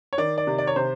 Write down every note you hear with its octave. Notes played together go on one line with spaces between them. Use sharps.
C#5
D#3 D5
D5
C3
D5
C#5
C3 C5